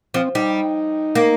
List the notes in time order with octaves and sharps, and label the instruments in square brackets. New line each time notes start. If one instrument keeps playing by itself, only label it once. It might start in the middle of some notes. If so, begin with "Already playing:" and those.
[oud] F3 [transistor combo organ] C4
[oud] G3 [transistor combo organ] D#4
[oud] A#3